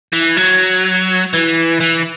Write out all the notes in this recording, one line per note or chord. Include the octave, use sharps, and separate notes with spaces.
E3
F#3
E3
E3